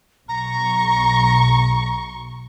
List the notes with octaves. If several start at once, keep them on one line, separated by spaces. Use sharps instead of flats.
B1 A#5 C#6